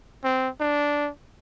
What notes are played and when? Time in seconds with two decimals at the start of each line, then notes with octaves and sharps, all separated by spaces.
0.24 C4
0.60 D4